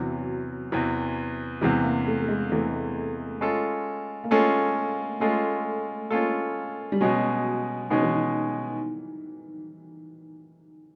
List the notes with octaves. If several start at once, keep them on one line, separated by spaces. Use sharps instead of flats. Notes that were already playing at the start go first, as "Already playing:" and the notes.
Already playing: E2 C3 E3 F#3
E2 C3 E3
E2 C3 E3 G#3
A#3
A3
A3
G#3
E2 C3 E3 A3
G#3 C#4 F4 A4
A#3
G#3 A3 C#4 F4 A4
G#3 A3 C#4 F4 A4
G#3 A#3 C#4 F4 A4
G3
B2 F#3 G#3 C#4
B2 D#3 G#3 C#4
E3
D#3